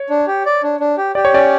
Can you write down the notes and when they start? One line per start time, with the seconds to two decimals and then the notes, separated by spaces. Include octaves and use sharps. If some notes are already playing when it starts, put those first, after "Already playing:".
Already playing: C#5
0.10 D4
0.27 G4
0.46 D5
0.63 D4
0.80 D4
0.98 G4
1.15 G4 D5
1.25 C#5
1.33 C#4 D5